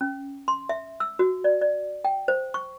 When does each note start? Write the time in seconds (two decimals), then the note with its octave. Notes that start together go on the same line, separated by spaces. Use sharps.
0.01 C#4
0.48 C6
0.69 E5
1.00 E6
1.19 F#4
1.44 D5
1.61 D5
2.05 G5
2.28 C5
2.54 C#6